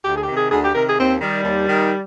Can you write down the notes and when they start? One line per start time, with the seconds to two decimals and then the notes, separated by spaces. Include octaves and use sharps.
0.05 D2 G4
0.15 G#4
0.21 G4
0.27 C3 D#3
0.35 G#4
0.50 D2 G#4
0.62 G4
0.74 C3 D#3 A#4
0.87 G#4
0.98 D#2 C4
1.21 D#3 G3
1.44 D#2
1.68 D#3